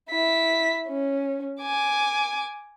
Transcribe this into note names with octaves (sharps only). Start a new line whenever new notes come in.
E4 B6
C#4
G#5 D6